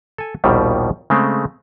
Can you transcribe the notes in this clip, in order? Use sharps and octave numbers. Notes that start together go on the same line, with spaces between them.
A4 G#5
A#1 D#2 B2 D#3 G3
C#3 G#3 A3 C4